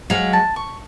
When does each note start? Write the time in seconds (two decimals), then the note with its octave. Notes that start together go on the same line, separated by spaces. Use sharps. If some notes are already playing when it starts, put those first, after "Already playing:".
0.10 F#3 G#3 F5
0.33 A5
0.56 C#6